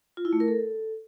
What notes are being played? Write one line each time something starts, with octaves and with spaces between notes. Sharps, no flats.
F4
E4
A3
A#4
A4